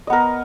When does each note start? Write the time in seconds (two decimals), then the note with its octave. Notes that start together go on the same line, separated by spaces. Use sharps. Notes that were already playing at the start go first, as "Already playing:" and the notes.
0.07 D#5
0.10 B3
0.13 A#4